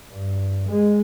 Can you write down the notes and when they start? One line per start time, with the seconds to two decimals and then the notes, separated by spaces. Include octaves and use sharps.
0.11 G2
0.68 G#3